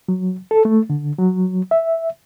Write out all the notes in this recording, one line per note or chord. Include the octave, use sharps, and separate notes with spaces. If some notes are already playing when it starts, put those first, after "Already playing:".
F#3
A4
A3
D3
F#3
E5